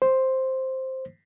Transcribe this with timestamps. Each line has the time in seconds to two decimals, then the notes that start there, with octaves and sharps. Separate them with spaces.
0.02 C5